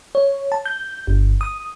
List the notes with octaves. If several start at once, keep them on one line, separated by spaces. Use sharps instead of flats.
C#5
A5
G6
G1
D#6